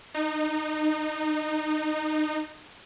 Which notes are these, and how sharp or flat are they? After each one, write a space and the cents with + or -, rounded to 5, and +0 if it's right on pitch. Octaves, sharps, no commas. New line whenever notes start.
D#4 -20